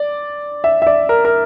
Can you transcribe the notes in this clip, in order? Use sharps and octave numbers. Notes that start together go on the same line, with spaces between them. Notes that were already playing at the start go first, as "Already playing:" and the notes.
Already playing: D5
E5
E5
D5
A#4
A#4